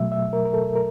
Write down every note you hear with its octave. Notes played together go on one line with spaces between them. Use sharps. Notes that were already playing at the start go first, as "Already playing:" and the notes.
Already playing: B2 F#3 A3 E5
E5
A#4
A#4
A4
A#4